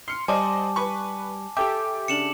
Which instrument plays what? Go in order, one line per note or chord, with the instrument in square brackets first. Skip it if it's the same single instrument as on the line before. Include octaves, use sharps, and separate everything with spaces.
[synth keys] C6 [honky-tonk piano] F6 C#7
[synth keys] G3 [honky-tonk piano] C5 D5 D#5 [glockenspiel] G#5 A5 D6
[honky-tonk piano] B4 B5 C#6
[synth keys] G4 A4 E5 [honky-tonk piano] G5 [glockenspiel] D6
[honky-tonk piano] C#3 D4 [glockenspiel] C#7 E7 F#7